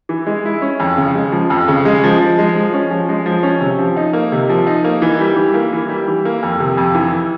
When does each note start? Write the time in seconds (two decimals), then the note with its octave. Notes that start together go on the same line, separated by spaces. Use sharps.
0.09 E3
0.27 G#3
0.45 E4
0.62 C#4
0.80 F2
0.97 C#3
1.15 G#3
1.32 F3
1.50 F2
1.68 C#3
1.85 G#3
2.04 F3
2.21 F3
2.39 G#3
2.56 F3
2.73 C#4
2.91 F3
3.09 G#3
3.26 F3
3.43 C#4
3.61 C3
3.79 F3
3.97 D#4
4.13 A#3
4.32 C3
4.49 F3
4.67 D#4
4.84 A#3
5.02 E3
5.20 G3
5.36 E3
5.54 A#3
5.73 E3
5.89 G3
6.08 E3
6.25 A#3
6.43 F2
6.60 C3
6.77 F2
6.95 E3